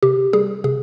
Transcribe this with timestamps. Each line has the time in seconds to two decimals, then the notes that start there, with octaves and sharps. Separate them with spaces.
0.03 C3 G4
0.33 G3 G#4
0.64 C3 G#4